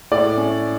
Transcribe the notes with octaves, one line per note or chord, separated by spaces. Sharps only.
A2 D5
C#4